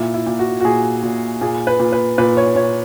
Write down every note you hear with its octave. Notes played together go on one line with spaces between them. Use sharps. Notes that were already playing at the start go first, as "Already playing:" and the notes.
Already playing: A#2 E4
E4
A#2
F#4
F#4
A#2 G#4
A#2
A#2 G#4
B4
A#2
B4
A#2 B4
C#5
A#2 C#5